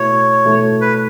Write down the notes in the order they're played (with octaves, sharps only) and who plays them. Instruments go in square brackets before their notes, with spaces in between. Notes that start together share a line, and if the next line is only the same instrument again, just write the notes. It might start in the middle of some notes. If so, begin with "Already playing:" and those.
Already playing: [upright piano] B2 A3 E4 [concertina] C#5
[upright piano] B2 A3 E4 A4
[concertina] B4